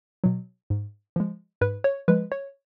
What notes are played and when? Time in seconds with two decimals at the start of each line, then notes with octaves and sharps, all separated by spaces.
0.24 B2 F#3
0.70 G#2
1.16 F3 G#3
1.61 G#2 B4
1.84 C#5
2.08 F3 G#3 B4
2.32 C#5